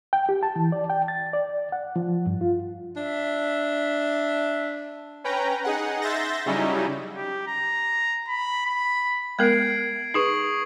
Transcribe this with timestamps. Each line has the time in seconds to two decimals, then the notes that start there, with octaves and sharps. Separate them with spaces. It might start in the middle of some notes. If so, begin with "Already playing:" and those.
0.13 G5
0.29 G4
0.43 A5
0.56 E3
0.72 D5
0.90 G5
1.08 A6
1.33 D5
1.72 F#5
1.96 F3
2.26 G2
2.41 F4
2.96 D4 E5
5.24 C#4 B4 G5 A#5
5.64 D#4 G#4 F#5
6.01 E5 C6 G6 A6 A#6
6.46 C#3 F#3 G3 C#4 D#4 E4
7.17 G4
7.47 A#5
8.28 B5
8.66 B5
9.39 G#3 B3 A#4 G#6 C7 D7
10.14 D#4 G#4 B4 C#6 D#6 F#7